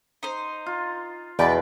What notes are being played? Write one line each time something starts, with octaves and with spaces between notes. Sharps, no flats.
D#4 C5
F4
E2 B2 B4 D5 G5